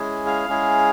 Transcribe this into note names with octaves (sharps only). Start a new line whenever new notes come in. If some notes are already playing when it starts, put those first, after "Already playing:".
Already playing: G#3 C#4 E4 G#4
F5
G#3 C#4 E4 G#4